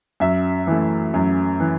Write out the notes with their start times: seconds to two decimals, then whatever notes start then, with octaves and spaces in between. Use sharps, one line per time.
0.20 F#2 E5
0.67 E3 A3
1.14 F#2
1.60 E3